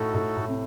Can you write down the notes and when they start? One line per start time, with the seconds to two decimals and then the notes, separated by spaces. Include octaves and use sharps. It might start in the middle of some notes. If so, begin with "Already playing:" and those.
Already playing: A2 D#4 F#4 A4
0.14 A2
0.37 A2
0.48 C3